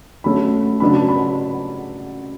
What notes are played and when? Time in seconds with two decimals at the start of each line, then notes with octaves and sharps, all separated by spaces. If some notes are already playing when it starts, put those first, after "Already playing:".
0.24 D3 F#3 A3 C#4 B5
0.80 C#3 F#3 B3 D4 B5
0.95 A5
1.09 B5